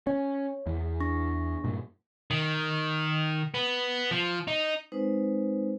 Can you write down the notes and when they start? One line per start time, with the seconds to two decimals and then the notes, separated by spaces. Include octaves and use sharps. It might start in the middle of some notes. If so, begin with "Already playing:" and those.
0.07 C#4 C#5
0.66 E2
1.00 D4 C#6 A#6
1.64 G2 A#2
2.31 D#3
3.54 B3
4.11 F3
4.48 D#4
4.92 G#3 C4 D#4 B4 C5